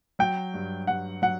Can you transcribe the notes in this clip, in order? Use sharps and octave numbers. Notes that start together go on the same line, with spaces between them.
F#3 G5
G2
G2 F#5
F#3 F#5